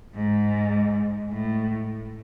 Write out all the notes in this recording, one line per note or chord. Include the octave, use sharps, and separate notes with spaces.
G#2
A2